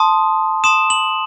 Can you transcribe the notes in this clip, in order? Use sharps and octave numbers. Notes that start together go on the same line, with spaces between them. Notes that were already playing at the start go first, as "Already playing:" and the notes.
Already playing: A5 C6 D#6
A5 C6 D#6 E7
F#7